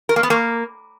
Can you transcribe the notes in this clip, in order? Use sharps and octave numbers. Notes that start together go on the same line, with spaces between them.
A#4
A#3
B3
A#3